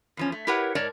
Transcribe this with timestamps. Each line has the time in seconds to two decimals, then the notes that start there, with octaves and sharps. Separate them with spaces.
0.17 E2 F3 C#4
0.32 A3
0.47 E4 G4 A#4 B4 C#5 F#5
0.75 G#2 A#4 C#5 D5 A5